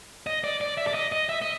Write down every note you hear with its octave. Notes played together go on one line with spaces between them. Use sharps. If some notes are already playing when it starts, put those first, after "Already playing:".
D#5
D5
D5
E5
D5
D#5
D#5
E5
D#5